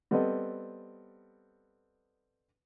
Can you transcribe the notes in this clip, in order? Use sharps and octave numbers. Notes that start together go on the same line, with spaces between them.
G3 B3 C4 A4 D#5